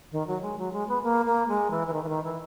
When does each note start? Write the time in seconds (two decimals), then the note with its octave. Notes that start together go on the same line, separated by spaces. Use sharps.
0.12 D#3
0.27 F#3
0.42 G#3
0.58 F#3
0.73 G#3
0.88 B3
1.03 A#3
1.25 A#3
1.48 G#3
1.70 E3
1.87 E3
1.93 D#3
2.03 E3
2.08 D#3
2.24 E3